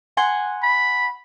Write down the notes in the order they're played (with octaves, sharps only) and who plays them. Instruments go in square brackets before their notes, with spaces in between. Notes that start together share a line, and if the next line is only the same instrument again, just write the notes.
[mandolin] F#5 G#5 C6
[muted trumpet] B5